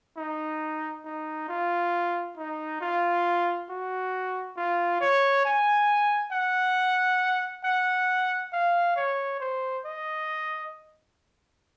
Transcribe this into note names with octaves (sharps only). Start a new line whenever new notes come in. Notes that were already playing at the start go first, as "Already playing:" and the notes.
D#4
D#4
F4
D#4
F4
F#4
F4
C#5
G#5
F#5
F#5
F5
C#5
C5
D#5